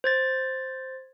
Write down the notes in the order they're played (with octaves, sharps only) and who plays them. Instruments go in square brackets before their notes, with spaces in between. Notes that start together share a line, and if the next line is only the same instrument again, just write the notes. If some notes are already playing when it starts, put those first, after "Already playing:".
[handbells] C5 G#6 A6